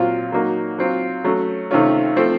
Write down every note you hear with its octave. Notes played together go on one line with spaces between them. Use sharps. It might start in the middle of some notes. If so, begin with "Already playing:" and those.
Already playing: A#2 F#3 C4 F4
F#3 A#3 D#4 F#4
F#3 C4 F4
F#3 A3 C#4
C3 D#3 A3 C#4 F4
F3 A3 C4